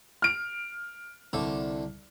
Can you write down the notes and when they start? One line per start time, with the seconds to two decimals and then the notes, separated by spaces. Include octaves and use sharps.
0.22 F6 D7
1.33 C2 D3 A4